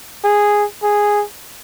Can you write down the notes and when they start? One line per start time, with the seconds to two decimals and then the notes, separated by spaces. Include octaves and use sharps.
0.25 G#4
0.83 G#4